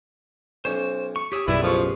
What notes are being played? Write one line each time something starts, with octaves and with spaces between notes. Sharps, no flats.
B1 C#4 C5
C#6
G4 C#5 G#5 D#6 E6
B1 F#2 G3 E4 G4 G#4 B4
A1 F3 F4 C#6